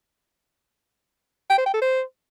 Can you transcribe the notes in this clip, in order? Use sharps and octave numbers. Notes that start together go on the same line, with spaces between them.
G5
C5
G5
A4
C5